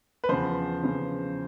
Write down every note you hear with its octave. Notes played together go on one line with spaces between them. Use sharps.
B4
E2 C#3 F3 C5
E2 C#3 F3